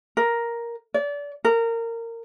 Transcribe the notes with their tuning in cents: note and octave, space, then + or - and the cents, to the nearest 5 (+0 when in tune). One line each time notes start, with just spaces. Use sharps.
A#4 +5
D5 -30
A#4 -20